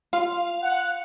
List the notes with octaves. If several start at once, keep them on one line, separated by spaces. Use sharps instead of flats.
F4 F5
F#5